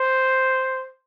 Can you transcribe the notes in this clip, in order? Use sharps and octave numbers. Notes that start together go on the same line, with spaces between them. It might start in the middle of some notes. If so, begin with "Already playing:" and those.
Already playing: C5